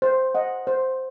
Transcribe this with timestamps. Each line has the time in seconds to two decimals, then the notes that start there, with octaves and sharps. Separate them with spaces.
0.02 C5
0.35 D#5 F#5
0.67 C5